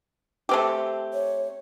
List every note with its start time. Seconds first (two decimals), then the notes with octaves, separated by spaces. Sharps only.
0.49 A3 C4 G4
1.13 C#5